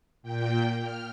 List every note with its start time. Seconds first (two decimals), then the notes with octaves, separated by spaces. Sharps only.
0.22 A#2 G5
0.81 F6